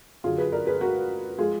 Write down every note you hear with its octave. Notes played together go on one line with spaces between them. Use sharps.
F#2 D3 F#3 F4 G#4
G#4 B4
A#4 D5
G#4 B4
F#4 A#4
F3 G#3 F4 G#4